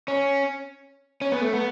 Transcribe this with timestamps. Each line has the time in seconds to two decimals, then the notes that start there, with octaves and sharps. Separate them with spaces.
0.08 C#4
1.21 C#4
1.32 B3
1.41 A3
1.53 B3